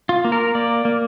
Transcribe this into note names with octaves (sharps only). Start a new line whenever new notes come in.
F4
A#3
A#4
A#3 D5
A#3